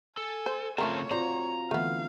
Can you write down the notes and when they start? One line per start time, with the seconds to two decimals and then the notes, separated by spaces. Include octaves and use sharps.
0.17 A4 G#5
0.46 C5
0.78 C#3 F3 A3 C4 A#4 C#5 A5
1.11 C4 F4 F#4 C5 D5 A#5
1.71 D3 E3 A3 B3 F5